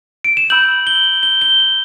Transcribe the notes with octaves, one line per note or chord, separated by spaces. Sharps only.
D7
E7
B5 E6 G6 F#7
G7
G7
G7
F#7